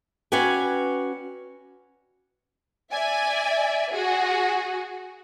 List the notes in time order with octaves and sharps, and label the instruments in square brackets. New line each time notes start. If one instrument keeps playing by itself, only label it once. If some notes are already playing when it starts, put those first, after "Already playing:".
[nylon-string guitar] C#4 F#4 B4 D5 G5 G#5
[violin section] D5 E5 G#5
F#4 G#4